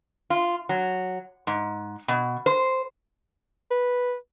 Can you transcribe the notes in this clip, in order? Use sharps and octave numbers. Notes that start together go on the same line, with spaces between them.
F4
F#3
G#2
B2
C5
B4